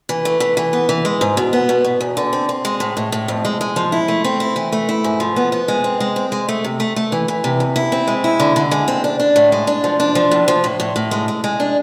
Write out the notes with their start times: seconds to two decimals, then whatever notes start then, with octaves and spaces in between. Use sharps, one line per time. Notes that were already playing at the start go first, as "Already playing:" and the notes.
0.09 E3
0.25 A3
0.40 E3
0.57 E3
0.73 B3
0.89 E3
1.05 G#3
1.21 G#2
1.37 B2
1.53 B3
1.69 B2
1.84 B2
2.01 E2
2.17 D3
2.33 C4
2.49 C4
2.65 G#3
2.80 A2
2.97 A2
3.12 A2
3.28 F2
3.45 G#3
3.61 G#3
3.76 F3
3.92 E4
4.08 A3
4.24 C4
4.40 E4
4.56 E3
4.72 A3
4.89 E4
5.04 G#2
5.20 F3
5.36 B3
5.52 B3
5.68 G#3
5.84 C4
6.00 G#3
6.16 C4
6.32 G#3
6.49 A3
6.64 C3
6.80 A3
6.96 A3
7.12 E3
7.28 E3
7.44 C3
7.60 F2
7.76 E4
7.92 C4
8.08 G#3
8.24 E4
8.40 D3
8.56 D3
8.71 G#3
8.88 C4
9.04 D4
9.20 D4
9.36 A2
9.52 G#3
9.67 D4
9.84 F3
10.00 D4
10.15 F3
10.31 A2
10.48 F3
10.64 A2
10.80 A2
10.96 A2
11.11 G#3
11.28 G#3
11.44 G#3
11.60 D4